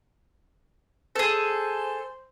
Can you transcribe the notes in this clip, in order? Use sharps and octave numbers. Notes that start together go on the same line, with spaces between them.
G#4 A4 C5